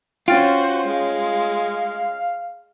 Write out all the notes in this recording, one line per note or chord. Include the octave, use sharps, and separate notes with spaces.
C#4 F4 F#4 C5 G5 F6 A6
G#3 F5